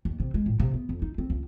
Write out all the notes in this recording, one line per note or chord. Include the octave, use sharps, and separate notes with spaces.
D#2
C3
G#3
A2
C3
B3
F2
D#4
C4
C#2